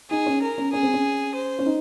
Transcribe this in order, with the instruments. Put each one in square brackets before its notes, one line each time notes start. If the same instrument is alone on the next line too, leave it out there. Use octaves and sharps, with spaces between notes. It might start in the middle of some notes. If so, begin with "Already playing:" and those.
[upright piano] D#4 [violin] G#4
[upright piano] C#4
[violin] A#4
[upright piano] C#4
[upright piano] C#4 [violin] G#4
[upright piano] C4
C#4
[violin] C5
[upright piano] C#4
D#4